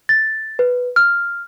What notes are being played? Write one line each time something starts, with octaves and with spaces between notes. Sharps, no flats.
A6
B4
F6